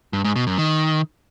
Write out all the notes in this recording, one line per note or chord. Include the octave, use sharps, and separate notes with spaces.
G2
G#2
B2
F#2
D#3